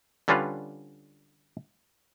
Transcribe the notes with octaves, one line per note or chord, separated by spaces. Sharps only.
D3 G3 C#4 D4 F4 B4